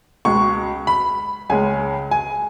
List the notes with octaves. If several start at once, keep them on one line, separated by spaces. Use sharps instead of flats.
C#2 B2 G#3 C#6
B5
C#2 C#3 G#3 G#5
G#5